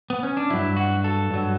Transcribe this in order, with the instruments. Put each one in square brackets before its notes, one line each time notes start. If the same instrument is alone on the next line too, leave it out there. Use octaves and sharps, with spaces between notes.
[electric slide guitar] B3
C#4
D4
G2 F#3 E4
F#4
A4
G2 F#3